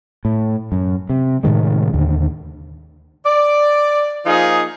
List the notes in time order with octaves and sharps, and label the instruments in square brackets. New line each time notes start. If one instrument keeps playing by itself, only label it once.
[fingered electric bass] A2
F#2
C3
A2 C3 D#3 G#3
D#2 D3
[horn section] D5
F3 A#3 D#4 F4 G#4